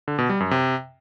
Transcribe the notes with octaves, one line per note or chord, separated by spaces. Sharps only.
D3
B2
G3
F#2
C3